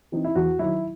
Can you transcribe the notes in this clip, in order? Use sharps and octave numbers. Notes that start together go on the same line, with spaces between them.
E3 C4 D#4
E4
E2 F#4
D#3 F#3 E4